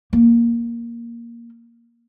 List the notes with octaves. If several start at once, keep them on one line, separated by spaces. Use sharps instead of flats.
A#3